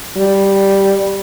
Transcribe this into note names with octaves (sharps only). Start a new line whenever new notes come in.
G3